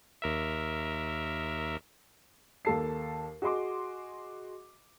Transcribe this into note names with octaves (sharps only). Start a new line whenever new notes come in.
D#2 A#4 E5
D#2 A#3 A4 A5 C7
F#4 G#4 D#5 C6 D6